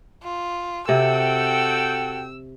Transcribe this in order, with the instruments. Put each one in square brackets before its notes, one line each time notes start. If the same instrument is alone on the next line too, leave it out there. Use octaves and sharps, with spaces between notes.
[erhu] F4
[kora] C3 [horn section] F#4 A4 G5 [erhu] E6